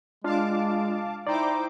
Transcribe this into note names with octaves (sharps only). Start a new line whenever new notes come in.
G#3 D4 F4 F5 A5 D6
D#4 E4 C5 D5 G5 D6